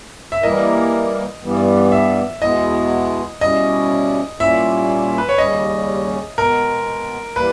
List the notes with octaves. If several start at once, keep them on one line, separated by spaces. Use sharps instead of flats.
E5
E3 G3 A#3 E4 A#4 D#5
G2 E3 G3 B3
E5
E2 B2 G#3 B3 E4 D#5
B2 G3 C#4 E4 D#5
A#2 G3 A#3 C#4 E4 E5
B4
C#5
D#2 C#3 G3 C#4 D#5
B2 G#3 B3 A#4
E3 G3 A#3 B4